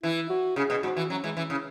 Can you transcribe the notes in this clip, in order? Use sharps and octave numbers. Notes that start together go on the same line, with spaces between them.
E3 E4
F#4
C#3 G#4
B2
G#2 F#4
E3
F#3 C#4
E3 G#3
E3 C#4
C#3 E4